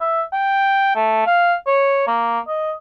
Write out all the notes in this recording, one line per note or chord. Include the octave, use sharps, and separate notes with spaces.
E5
G5
A3
F5
C#5
A#3
D#5